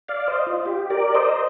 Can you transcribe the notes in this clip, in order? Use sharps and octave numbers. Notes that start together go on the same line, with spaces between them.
D5 F5
C5 D#5
F4
G4
A#4 D5
C5 D#5